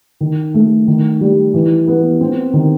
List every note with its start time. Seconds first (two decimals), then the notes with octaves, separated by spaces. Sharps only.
0.21 D#3
0.54 A3
0.88 D#3
1.21 G3
1.54 E3
1.87 B3
2.21 C4
2.53 D#3